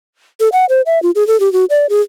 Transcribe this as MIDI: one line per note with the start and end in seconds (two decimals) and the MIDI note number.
0.40 0.49 69
0.52 0.65 78
0.69 0.81 72
0.86 1.01 76
1.03 1.11 65
1.15 1.26 68
1.27 1.39 69
1.40 1.51 67
1.53 1.65 66
1.70 1.86 74
1.90 2.01 68